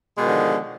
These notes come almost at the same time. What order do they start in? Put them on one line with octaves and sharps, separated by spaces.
G#3 B2 D#3 F3 D3